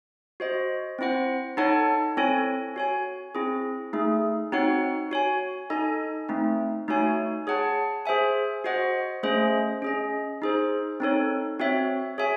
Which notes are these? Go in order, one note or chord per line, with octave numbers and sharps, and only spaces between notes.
F#4 C5 D#5
C4 E4 C5 F#5
D#4 A4 C#5 F#5 A5
C4 E4 A4 C#5 G#5
F#4 C#5 G#5
C4 E4 G#4
A3 D#4 G#4
C4 D#4 F#4 C#5 F#5
F#4 C#5 G#5
D#4 A4 D#5 G#5
A3 C4 D#4
A3 D#4 F#4 C#5 G#5
G#4 C#5 F#5 A5
G#4 C5 E5 G#5
F#4 C5 D#5 F#5
A3 C#4 G#4 C5 D#5
C#4 G#4 D#5
D#4 G#4 C5
C4 D#4 A4 C#5
C4 F#4 C#5 E5
G#4 C#5 E5 G#5